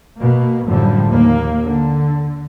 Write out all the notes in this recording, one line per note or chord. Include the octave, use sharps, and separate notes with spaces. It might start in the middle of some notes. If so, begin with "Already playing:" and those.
B2 A#3
F#2 A2 D3 F3 G3
D#2 A#3
D3